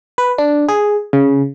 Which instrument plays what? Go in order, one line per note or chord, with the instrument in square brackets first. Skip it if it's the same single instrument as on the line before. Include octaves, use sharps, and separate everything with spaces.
[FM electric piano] B4
D4
G#4
C#3